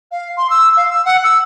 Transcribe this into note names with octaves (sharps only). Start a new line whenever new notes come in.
F5
C6
E6
F5
E6
F#5
E6